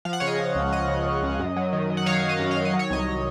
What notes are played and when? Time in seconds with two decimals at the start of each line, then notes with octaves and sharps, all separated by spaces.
0.05 F3 F5
0.13 F#5
0.20 C#3 C#5 F5
0.28 D#5
0.39 F3
0.55 C#2
0.72 F3 D#5
0.88 C#3
1.06 C#3
1.23 C#2
1.40 F#2
1.56 F#3
1.73 D#3
1.90 D#3
1.97 F#5
2.06 D#3 C#5 F5
2.23 D#3
2.29 D#5
2.40 F#2
2.51 F5
2.57 D#3
2.65 D#5
2.73 F#3
2.79 C#5
2.90 C2 D#5